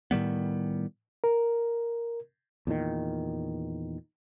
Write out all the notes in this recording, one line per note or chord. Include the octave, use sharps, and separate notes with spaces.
A2 D#3 G3 B3
A#4
E2 A#2 D#3